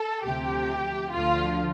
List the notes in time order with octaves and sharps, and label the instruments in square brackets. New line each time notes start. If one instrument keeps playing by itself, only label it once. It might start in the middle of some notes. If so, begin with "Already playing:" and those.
Already playing: [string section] A4
D2 C3 F3 G4
D2 D3 F3 F4